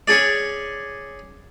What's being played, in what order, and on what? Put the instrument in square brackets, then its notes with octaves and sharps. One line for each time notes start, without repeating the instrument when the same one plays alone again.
[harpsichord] C#4 G#4 D5